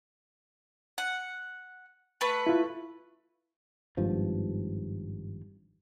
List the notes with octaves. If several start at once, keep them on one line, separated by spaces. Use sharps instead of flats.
F#5
A3 B4
E4 F4
G#1 G2 F3